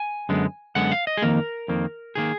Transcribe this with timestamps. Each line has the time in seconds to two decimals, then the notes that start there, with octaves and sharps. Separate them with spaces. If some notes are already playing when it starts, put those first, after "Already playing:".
Already playing: G#5
0.29 F#2 D3 G#3 B3
0.75 F#2 D3 G#3 B3 F#5
0.92 F5
1.07 D#5
1.17 G#4
1.22 F2 D#3 A#3 A#4
1.68 F2 D#3 A#3
2.15 D#3 A#3 G#4